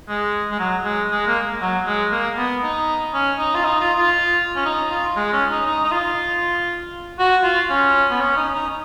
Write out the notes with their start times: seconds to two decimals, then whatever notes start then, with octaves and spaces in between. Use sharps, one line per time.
0.09 G#3
0.51 G#3
0.59 F#3
0.85 G#3
1.11 G#3
1.28 A#3
1.61 F#3
1.87 G#3
2.11 A#3
2.37 B3
2.63 D#4
3.14 C#4
3.39 D#4
3.55 F4
3.65 D#4
3.80 F4
3.98 F4
4.56 C#4
4.65 D#4
4.91 F4
5.17 G#3
5.33 C#4
5.50 D#4
5.66 D#4
5.85 D#4
5.92 F4
7.19 F#4
7.43 F4
7.70 C#4
8.10 B3
8.21 C#4
8.37 D#4
8.55 D#4